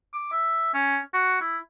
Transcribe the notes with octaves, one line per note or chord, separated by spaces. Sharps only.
D6
E5
C#4
F#4
E4